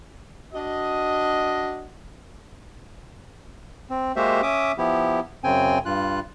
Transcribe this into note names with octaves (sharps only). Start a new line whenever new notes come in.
D4 F#4 D#5
C4
G#3 A#3 F#4 G4 C5 E5
C#4 E5 D6 D#6
F3 B3 E4 G4
F#2 C#3 C4 G5 G#5
G2 F4 F#6